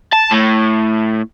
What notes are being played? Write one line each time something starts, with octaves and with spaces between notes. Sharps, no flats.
A5
A2